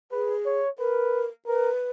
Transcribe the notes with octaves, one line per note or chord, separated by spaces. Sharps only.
G#4 B4
C#5
A#4 B4
A#4 B4